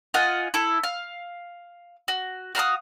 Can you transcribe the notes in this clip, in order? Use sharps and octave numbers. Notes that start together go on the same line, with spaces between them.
F4 D#5 F#5 G#5
E4 A4
F5
F#4
F#4 F5 A#5 D#6